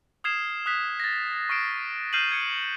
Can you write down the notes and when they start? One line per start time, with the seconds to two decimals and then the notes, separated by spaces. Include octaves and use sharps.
0.24 D#6 F6 G#6 C7 E7
0.66 D#6 F#6 B6
1.00 A6 A#6
1.49 C#6 F6 C7 D7 E7
2.13 F6 G6 C7 D#7 E7 F#7
2.32 G#6 C#7